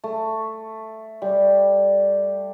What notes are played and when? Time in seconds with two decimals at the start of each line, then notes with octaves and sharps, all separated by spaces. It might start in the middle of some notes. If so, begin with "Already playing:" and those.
0.04 A3
1.22 G3